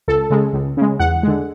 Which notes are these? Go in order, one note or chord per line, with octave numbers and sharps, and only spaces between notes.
C#2 A4
C#3 G#3
C#2
C#3 G#3
E2 F#5
D3 G#3